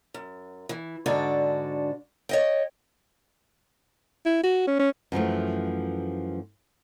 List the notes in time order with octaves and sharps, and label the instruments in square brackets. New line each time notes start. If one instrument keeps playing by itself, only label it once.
[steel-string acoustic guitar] F#2
E3
G#2 D3 D4 F#4
C#5 D#5 G5
[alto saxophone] E4
F#4
C#4
C#4
[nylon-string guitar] F#2 E3 F3 A3